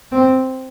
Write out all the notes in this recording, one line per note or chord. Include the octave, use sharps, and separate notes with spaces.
C4